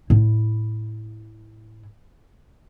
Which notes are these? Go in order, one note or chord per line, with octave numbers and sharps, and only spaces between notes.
A2 E4